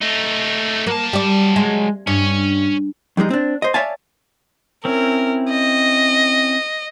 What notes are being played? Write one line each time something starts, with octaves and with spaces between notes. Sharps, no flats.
A3 D#4
F#3 A#3 A5
G3 D5
G#3
G2 C#4
F2 G3 G#3 D#4
C4 D4
C5 D#5
C#5 D5 E5 F5 G#5 A5
C4 C#4 E4 A#4
D#5